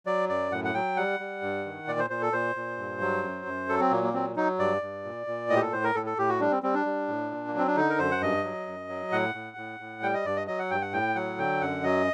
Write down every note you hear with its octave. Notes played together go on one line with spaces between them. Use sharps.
F#3 D5
F#2 D5
A2 F#5
F#5
F#3 G5
G3 F#5
G3
G2
D#3
A#2 D5
C5
A#2 C5
A4
A#2 C5
A#2
G2
F#3
F#2
F#2
F#3 A4
C4
A#2 A#3
A#3
F#3 C4
F#3 D#4
G2 D5
G2
A#2
A#2
A2 D#5
G4
A4
A2 C5
A#4
A2 A4
A4
A2 G4
F#4
G3 D4
C4
G3 C4
D4
G3
A2
A#2
A#3
F#3 C4
D4
D3 D#4
A#4
F#2 C5
F#5
G2 D#5
F#3
F#2
F#3
A2 F#5
A2
A2
A2
G3 G5
D#5
G2 D5
D#5
F#3 D#5
F#5
G2 G5
F#5
A2 G5
F#3 F#5
D3 G5
F#2 F#5
F#3 D#5